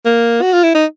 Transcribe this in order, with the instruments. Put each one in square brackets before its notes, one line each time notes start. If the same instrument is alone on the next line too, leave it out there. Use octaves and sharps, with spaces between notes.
[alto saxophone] A#3
F#4
F4
E4
D#4